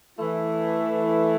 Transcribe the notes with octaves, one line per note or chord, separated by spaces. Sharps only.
E3 A3 E4